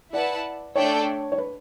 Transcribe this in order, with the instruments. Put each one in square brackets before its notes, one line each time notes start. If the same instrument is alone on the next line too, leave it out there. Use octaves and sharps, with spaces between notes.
[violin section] E4 B4 F#5 A5 [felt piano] D5
[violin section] A3 D4 A4 D5 G5 [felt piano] C#5
[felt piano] C#5
B4